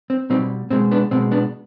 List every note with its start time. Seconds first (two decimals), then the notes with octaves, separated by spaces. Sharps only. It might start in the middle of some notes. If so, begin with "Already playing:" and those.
0.10 C4
0.30 B2 G3 C4 D#4
0.71 B2 G#3 C4
0.91 B3 D4
1.11 B2 G#3 C4
1.31 B3 D4